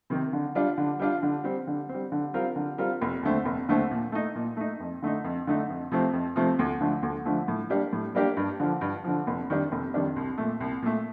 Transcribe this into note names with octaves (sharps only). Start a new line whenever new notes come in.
C3 D#3
D3
G3 D4 F4
D3
G3 D4 F4
D3
G3 C4
D3
G3 C4
D3
G3 C4 F4 A#4
D3
G3 C4 F4 A#4
F1
D#2 D3 A3 C4
F1
D#2 D3 A3 C4
A#2
A3 D#4
A#2
A3 D#4
F2
D3 A3 D#4
F2
D3 A3 D#4
F2
C3 F3 A3 C4
F2
C3 F3 A3 C4
D2
D3 F3 A3
D2
D3 F3 A3
A2
G3 A#3 D4 G4
A2
G3 A#3 D4 G4
G2
D3 F3
G2
D3 F3
F1
F2 D#3 G3 D4
F1
F2 D#3 G3 D4
C2
A#2 A3
C2
A#2 A3